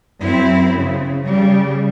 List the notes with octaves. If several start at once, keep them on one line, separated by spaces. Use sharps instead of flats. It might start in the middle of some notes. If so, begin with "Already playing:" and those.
F#2 C4 E4
C#3
C#3 G3